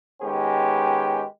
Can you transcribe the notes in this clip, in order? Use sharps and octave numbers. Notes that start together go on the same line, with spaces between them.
D#3 G#3 B3 C#4 G4